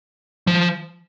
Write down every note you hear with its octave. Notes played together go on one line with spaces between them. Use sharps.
F3